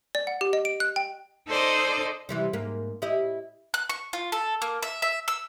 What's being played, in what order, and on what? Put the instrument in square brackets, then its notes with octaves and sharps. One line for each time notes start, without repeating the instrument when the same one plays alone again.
[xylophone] D5
F#5
G4
D#5
D7
F#6
G5
[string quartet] D#4 A4 C5 D5 D#5
[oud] C3 E3 G3
G#2 A#3
E4 G4 D#5
[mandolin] F#6
C#6
F4
A4
A#3
E5
E5
E6